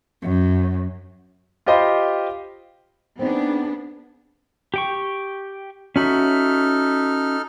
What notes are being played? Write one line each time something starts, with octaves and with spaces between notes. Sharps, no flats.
F#2
F4 G4 C5 D#5 B5 C6
B3 C4 D4 D#4 G#4
G4 G5 C#6
C#4 D#4 F#4 A4 E5 F6